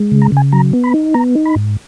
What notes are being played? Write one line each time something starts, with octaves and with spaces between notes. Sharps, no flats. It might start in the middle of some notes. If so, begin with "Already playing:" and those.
Already playing: G#3
C#3
A#5
C#3 G#5
F#3 A#5
B3
B5
D#4
B3 A#5
D#4
B5
G#2